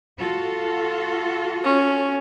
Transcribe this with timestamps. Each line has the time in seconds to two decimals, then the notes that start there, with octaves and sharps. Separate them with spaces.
0.17 F4 F#4 A4
1.64 C#4